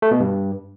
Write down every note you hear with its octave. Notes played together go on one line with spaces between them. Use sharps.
A3
B2
G2